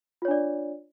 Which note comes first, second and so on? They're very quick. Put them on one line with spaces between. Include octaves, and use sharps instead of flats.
F4 C#5 D4 D5